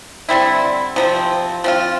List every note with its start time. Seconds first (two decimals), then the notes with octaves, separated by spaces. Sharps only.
0.29 D3 G3 C4 E4
0.96 C3 F3 C4
1.64 F3 C4 F4